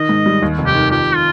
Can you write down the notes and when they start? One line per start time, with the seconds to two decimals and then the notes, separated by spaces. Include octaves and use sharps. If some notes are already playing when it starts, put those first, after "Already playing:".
Already playing: D#3 D#5
0.09 G#2
0.26 G3
0.42 D#2
0.58 F1
0.66 G4
0.74 D#3
0.91 F2 G4
1.15 F4